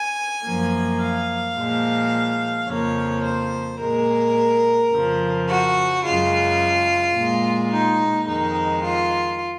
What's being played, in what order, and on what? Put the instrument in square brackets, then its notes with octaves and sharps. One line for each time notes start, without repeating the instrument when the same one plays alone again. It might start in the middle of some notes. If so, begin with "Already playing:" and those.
Already playing: [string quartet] G#5
F#2 F3 A#3
F5
A#2 F3 G#3
F2 C#3 F3 A#3 C#5
C5
A#2 G#3 A#4
F2 C#3 F3
F#4
F#2 C#3 G#3 F4
A#2 G#3
D#4
F2 D#3 G#3 D#4
F4